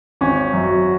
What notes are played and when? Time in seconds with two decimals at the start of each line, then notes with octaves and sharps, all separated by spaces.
0.21 G#1 C#4
0.53 F#2
0.64 F#4